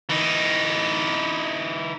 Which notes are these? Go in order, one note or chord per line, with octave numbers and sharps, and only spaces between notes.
E3 D#4